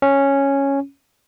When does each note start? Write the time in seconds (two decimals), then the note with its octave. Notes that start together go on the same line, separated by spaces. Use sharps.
0.02 C#4